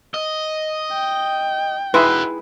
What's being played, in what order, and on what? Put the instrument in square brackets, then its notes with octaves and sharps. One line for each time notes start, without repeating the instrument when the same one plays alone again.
[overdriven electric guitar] D#5
[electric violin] G5
[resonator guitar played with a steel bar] G#3 D#4 E4 [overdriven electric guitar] F#4 E5 [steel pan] B4